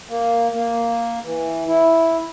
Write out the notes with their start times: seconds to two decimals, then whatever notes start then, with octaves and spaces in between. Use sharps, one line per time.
0.09 A#3
0.53 A#3
1.24 E3
1.68 E4